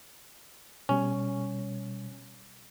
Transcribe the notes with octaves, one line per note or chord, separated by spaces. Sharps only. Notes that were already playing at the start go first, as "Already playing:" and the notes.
B2 G3 C#4